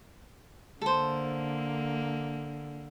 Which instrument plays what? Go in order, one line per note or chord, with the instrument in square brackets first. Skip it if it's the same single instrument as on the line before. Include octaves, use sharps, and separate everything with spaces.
[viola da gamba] D3 A#3 [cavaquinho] A4 C5